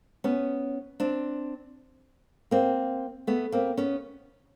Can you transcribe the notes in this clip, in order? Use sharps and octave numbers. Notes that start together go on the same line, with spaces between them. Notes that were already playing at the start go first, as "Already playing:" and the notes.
B3 C#4
C4 D4
A#3 C4
A3 B3
A#3 C4
B3 C#4